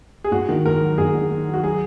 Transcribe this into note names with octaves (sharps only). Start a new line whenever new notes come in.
G#4
G#2 F#4
D#3
G#2 A#4
F#3
G#2 G#4
D#3
D#3
F#3
F#4
F#3 G#4